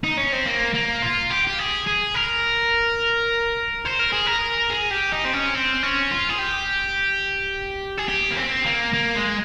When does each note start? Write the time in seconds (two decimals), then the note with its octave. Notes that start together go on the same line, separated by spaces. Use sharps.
0.04 D#4
0.18 C#4
0.32 C4
0.45 A#3
0.74 A#3
1.02 F4
1.30 G4
1.47 G4
1.59 G#4
1.87 G#4
2.15 A#4
3.85 C5
3.99 A#4
4.12 G#4
4.26 A#4
4.70 G#4
4.91 G4
5.12 D#4
5.25 C4
5.33 C#4
5.55 C4
5.83 C#4
6.11 F4
6.30 G#4
6.39 G4
7.98 G#4
8.09 G4
8.31 A#3
8.37 C4
8.65 A#3
8.93 A#3
9.15 G#3